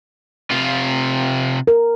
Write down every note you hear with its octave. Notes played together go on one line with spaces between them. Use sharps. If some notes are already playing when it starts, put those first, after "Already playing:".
C3 F4
A#4